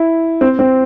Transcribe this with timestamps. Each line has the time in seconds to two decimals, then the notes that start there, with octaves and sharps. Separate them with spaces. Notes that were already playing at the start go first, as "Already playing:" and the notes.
Already playing: E4
0.41 C4
0.59 C4